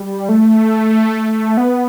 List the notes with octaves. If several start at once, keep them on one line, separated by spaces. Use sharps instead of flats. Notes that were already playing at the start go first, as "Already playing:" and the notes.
Already playing: G3
A3
B3